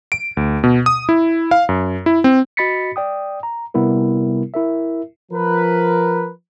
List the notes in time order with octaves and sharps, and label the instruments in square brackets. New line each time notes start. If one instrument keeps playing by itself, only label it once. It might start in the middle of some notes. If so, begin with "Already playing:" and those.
[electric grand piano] D7
D2
B2
D#6
E4
F5
F#2
E4
C4
[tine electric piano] F#4 D#5 B5 A6 B6 C#7
D5 G5 D#6
A#5
C3 G3 B3 E4 A#4
E4 A#4 E5
[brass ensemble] F3 A#4 B4